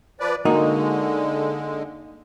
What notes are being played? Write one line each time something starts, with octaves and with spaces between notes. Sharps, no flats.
F3 B4 D5
D3 G#3 A#3 D#4 F#4